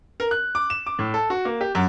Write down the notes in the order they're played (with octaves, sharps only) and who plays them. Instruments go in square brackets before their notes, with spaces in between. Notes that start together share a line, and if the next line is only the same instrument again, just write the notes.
[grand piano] A#4
F#6
D6
E7
D6
A2
A4
F#4
A#3
G4
F#2